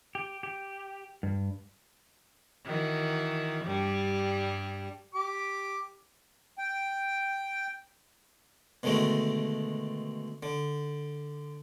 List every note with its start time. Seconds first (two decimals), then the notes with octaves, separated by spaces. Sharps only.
0.15 G4
0.43 G4
1.23 G2
2.65 D#3 E3 F#4
3.65 G2 G3
5.14 G4 D6
6.58 G5
8.83 B2 D3 D#3 G#3 A3
10.43 D3